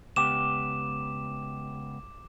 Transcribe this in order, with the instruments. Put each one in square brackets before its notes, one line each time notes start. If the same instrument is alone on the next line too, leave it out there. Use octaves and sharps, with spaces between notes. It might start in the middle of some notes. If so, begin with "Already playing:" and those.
[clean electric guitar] C#2 B3 G4 [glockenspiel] D6 E7